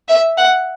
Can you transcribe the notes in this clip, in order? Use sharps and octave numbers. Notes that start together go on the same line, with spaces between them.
E5
F#5